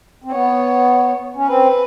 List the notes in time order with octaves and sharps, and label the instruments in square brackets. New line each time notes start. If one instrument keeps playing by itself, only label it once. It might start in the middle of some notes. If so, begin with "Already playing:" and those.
[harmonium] C4
[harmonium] B3 [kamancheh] C#5
[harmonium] C#4
[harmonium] C4 [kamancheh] B4